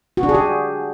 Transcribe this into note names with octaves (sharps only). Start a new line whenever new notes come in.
F#4
D4
G#4
G4